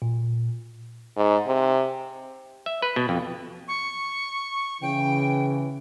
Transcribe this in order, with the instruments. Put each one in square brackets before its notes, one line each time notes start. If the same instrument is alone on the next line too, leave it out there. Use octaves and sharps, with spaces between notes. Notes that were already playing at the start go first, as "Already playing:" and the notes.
[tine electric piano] A#2
[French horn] G#2
C3
[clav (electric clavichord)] E5
B4
B2
F2
[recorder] C#6
[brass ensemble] C#3 E3 [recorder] G5